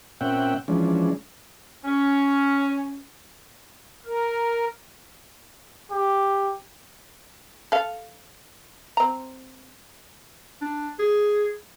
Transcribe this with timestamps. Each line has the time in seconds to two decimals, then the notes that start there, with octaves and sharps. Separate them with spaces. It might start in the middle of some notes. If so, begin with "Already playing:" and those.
0.21 A#2 C4 C#4 E5 F#5 G5
0.68 E3 F3 G#3 C#4 D4
1.85 C#4
4.05 A#4
5.91 G4
7.72 A4 F5
8.97 C4 A#5
10.62 D4
10.99 G#4